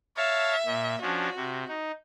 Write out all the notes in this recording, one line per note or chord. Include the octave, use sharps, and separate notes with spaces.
C#5 E5 F5 A5
A#2
F3 C#4 D4 F#4
C3
D#4